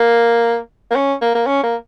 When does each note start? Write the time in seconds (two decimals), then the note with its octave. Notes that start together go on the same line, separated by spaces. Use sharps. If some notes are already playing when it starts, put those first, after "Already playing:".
Already playing: A#3
0.91 A#3
0.95 C#4
1.22 A#3
1.35 A#3
1.47 C#4
1.63 A#3